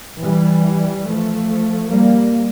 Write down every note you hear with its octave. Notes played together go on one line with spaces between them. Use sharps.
E3 G3
F3 A3
G3 A#3